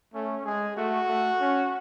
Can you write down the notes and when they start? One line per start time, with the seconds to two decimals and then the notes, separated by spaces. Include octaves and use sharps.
0.14 A3 C#4
0.46 G#3 G#4
0.77 A3 F#4
1.08 A3
1.40 C#4